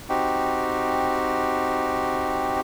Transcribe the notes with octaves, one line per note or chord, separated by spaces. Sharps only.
C4 D#4 F#4 G4